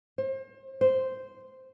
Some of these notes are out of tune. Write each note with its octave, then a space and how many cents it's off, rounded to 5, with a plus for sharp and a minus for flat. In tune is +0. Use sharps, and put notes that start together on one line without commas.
C5 +35
C5 -5